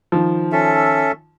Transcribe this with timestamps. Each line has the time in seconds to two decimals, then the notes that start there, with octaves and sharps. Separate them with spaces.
0.12 D#3 F3
0.52 C#4 A4 E5